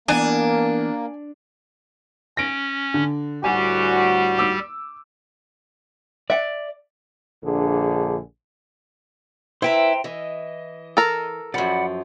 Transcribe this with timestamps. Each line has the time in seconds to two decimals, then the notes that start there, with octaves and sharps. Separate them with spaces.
0.08 E3 A#3 B3 D4 G#5
2.37 C#4 A#6 D7
2.94 D3
3.44 D2 A2 G3 F#4 G4 G#5
4.38 D6 E6
6.30 D5 E5 F#5
7.43 A#1 D3 G#4
9.62 E4 B4 C5 E5 G5 A#5
10.04 E3 D#5
10.97 A4 A#4
11.54 F#2 F3 D5 F#5 B5